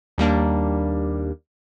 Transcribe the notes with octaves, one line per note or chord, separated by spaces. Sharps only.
D#2 G3 A#3 D4